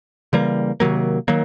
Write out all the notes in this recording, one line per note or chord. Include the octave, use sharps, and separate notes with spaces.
C#3 E3 G3 A#3
C3 D#3 F#3 A#3
D#3 F#3 A#3